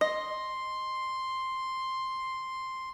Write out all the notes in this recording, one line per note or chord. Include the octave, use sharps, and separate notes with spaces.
D#5 C6